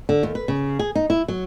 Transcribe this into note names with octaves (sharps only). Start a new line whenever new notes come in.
D3
D#2
B4
C#3
G#4
D#4
E4
F#3